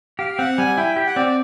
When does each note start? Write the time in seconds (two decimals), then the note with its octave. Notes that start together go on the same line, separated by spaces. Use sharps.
0.19 G4 F5
0.38 C4 F#5
0.58 G3 G#5
0.77 E4 G5
0.96 G4 G5
1.06 F#5
1.16 C4 D5
1.26 D5